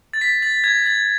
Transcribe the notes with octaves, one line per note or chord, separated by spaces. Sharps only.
A6
B6
A6
G#6
A6